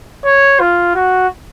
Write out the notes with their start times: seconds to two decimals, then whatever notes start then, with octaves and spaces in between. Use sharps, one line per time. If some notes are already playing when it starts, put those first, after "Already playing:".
0.25 C#5
0.60 F4
0.95 F#4